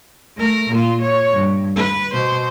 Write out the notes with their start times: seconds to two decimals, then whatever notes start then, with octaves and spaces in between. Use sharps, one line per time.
0.37 A3 A#4
0.71 A#2 F4
1.02 C#5
1.31 G2
1.75 B4
2.13 B2 C5